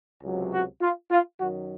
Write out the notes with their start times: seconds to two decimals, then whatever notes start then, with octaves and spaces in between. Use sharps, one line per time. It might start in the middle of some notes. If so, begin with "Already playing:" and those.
0.23 C#2 C3 F#3
0.52 F#4
0.81 F4
1.11 F4
1.40 F#2 D#3 F#3 F#4